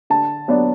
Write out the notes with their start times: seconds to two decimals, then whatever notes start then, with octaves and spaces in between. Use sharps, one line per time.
0.10 D3 A5
0.48 F#3 B3 D4